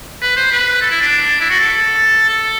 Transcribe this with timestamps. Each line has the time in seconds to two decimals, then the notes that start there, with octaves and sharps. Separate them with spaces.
0.22 B4
0.37 C5
0.52 B4
0.81 A4
0.91 E4
1.01 D4
1.40 E4
1.50 F#4
1.60 A4
2.29 A4